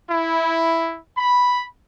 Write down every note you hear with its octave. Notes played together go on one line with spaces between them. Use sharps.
E4
B5